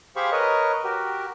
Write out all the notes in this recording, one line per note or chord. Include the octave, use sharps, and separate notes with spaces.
G4 G#4 C5 F5 B5 C#6
A#4 B4 C#5 D#5
F#4 G4 A#4